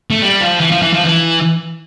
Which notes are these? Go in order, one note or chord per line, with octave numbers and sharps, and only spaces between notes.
A3
G3
F3
E3
F3
E3
F3
E3